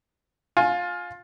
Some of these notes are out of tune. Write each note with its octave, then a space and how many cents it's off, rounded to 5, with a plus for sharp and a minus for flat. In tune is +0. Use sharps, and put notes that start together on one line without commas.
F4 +20 G#5 +20